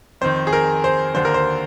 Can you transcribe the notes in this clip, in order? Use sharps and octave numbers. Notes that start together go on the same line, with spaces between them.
F2 D#3 C5
G#4
A#4
C5
D#2 D3 C5
A#4
C5